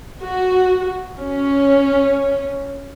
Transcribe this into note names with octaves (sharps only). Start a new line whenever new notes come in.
F#4
C#4